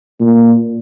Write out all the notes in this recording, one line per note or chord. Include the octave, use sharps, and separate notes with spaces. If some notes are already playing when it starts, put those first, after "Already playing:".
A#2